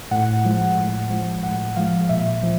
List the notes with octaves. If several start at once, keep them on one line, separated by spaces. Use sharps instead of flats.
A2 F#5
F3 G#3
A2
F3 G#3
A2 F#5
F3 G#3 F5
A#2 E5
F3